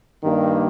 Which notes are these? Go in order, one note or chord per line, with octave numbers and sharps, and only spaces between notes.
G2 D#3 G3 A#3